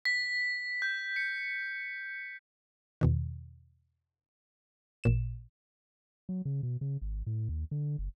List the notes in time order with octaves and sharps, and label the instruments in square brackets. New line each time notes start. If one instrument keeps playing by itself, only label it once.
[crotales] B6
G6
C#7
[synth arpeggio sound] E2 B2 D#3
A1 A#2 E7
[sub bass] F#3
C#3
B2
C#3
G#1
A2
D#2
D3
F#1